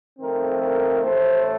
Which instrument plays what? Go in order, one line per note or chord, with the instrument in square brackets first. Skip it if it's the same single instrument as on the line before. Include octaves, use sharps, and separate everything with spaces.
[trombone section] F2 D#3 A3 C4 A#4
A#4
A1 A2 A3 C5